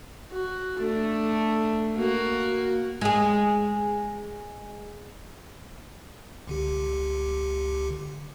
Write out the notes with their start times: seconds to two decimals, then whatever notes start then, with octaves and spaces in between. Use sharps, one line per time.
0.31 F#4
0.79 A3 D4
1.97 A#3 F#4
3.01 G#3 G#4
6.47 C#2 D3 G4